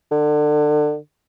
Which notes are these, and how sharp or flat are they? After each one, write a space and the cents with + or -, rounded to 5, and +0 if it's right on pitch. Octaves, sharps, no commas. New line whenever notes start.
D3 +30